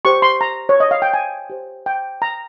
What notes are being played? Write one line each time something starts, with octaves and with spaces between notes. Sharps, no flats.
G4 C5 C#6
C6
A#5
C#5
D#5
F5
G5
G#5
G4 C5
G5
A#5